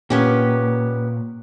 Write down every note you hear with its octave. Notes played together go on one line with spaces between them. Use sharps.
A#2 B3 C#4 G4